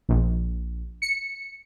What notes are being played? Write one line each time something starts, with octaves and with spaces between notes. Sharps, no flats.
A#1
C#7